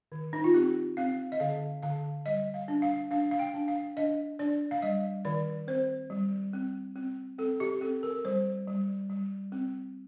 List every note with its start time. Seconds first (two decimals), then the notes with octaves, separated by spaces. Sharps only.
0.12 D#3
0.33 D#4
0.44 F4
0.54 C4 G4
0.97 C4 F5
1.32 D#5
1.40 D3 F5
1.83 D3 F5
2.26 G3 D#5
2.54 F5
2.68 D4
2.82 F5
3.11 D4 F5
3.31 F5
3.39 G5
3.54 D4
3.68 F5
3.97 D4 D#5
4.39 D4 D5
4.71 F5
4.82 G3 D#5
5.25 D#3 D5
5.67 C4 C5
6.10 G3
6.53 C4
6.96 C4
7.38 C4 A4
7.60 G4
7.81 C4 A4
8.03 A#4
8.25 G3 C5
8.67 G3
9.10 G3
9.52 C4